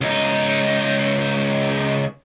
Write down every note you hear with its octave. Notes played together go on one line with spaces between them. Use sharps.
C#2 D#4